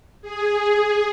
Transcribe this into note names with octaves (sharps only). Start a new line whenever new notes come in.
G#4